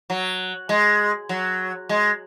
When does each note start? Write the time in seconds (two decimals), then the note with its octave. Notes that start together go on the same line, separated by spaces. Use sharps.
0.10 F#3
0.69 G#3
1.29 F#3
1.89 G#3